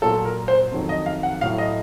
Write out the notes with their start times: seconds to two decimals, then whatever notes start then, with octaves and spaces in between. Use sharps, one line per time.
0.02 A#2 F#3 A4
0.25 A#4
0.48 C5
0.72 F2 D#3 F#3
0.89 D#5
1.06 F5
1.23 F#5
1.41 A2 F#3 F5
1.58 D#5